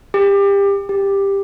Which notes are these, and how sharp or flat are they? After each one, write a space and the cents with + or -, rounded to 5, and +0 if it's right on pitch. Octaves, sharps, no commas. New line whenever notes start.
G4 +25
G4 +10